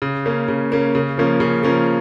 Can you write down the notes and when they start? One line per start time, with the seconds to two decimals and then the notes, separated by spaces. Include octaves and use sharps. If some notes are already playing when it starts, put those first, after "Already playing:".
0.02 C#3
0.26 A#3 C#4
0.48 C#3
0.72 A#3 C#4
0.95 C#3
1.17 F3 A#3 C#4 A#4
1.40 C#3
1.63 F3 A#3 C#4 A#4